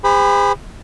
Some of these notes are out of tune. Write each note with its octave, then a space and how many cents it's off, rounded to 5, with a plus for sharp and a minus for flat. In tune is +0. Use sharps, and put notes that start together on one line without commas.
G#4 -45 C5 -35 B5 +0